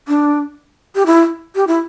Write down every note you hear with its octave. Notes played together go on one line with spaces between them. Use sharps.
D4
G4
E4
G4
E4